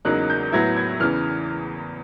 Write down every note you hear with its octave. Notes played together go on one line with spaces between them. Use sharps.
E2 C#3 F#3 A#3 D#4 F#6
G6
A2 F#3 B3 E4 G#6
G#6
E2 C#3 E3 F6